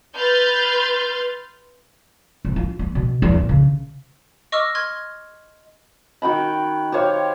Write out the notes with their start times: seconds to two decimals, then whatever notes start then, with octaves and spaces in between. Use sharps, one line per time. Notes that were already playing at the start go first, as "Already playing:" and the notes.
0.17 B4 C6 F6 G6 A6
2.45 C2
2.56 F4
2.79 B3
2.95 B2
3.22 E2
3.34 A#1
3.49 C#3
4.52 D#5 C#6 D6 E6 F6
4.75 C6 F6 G#6
6.22 D#3 F#4 G5 B5
6.92 G4 C5 C#5 F5